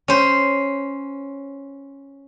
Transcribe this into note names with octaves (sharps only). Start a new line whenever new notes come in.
C#4 C5